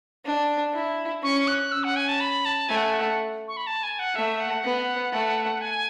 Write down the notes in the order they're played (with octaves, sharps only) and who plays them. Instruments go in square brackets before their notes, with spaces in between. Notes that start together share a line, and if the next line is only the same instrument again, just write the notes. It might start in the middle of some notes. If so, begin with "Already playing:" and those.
[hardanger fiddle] D4
E4
[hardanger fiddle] C#4 [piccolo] C#6
[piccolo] F#6
[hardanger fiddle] C#4 [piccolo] E6
[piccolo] F#5
G#5
A5
B5
A5
[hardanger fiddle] A3 [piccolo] G#5
[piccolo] F#5
G#5
F#5
C#6
B5
A5
G#5
F#5
[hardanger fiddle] A3 [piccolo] E5
[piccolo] F#5
[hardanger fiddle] B3
A3
[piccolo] G#5